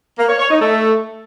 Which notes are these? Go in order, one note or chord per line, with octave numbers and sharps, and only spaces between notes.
A#3
C#5
C#5
D#4
A3